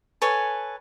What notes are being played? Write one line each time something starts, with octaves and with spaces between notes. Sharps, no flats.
A4 B4 C#5 G#5